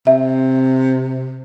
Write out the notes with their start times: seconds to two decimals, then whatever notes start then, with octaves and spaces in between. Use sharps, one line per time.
0.07 C3 E5